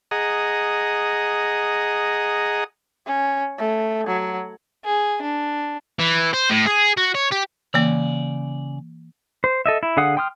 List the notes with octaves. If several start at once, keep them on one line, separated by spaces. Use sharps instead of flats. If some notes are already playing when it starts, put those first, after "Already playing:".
G#4 D#5 F#5 A#5
C#4
A3
F#3
G#4
D4
E3
C5
A2
G#4
F#4
C#5
G4
C#3 E3 A#3 D5
C5
A4 D#5 E5
E4
D3 G#4 F5 F#5 D#6
G5 C6 D#6 F6